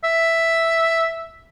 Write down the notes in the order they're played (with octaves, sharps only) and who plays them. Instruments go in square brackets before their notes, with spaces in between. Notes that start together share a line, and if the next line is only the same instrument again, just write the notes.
[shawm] E5